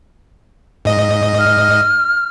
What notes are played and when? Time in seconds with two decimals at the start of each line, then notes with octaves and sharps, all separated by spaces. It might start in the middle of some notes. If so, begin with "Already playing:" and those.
0.85 G#2 D#5
1.39 F6